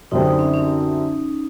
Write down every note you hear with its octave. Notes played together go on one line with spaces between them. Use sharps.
F#2 D3 G3 C4 D#4
D#4
C#4
C#4